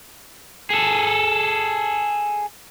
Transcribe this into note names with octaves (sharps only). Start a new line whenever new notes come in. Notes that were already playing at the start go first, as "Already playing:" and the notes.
G#4 A4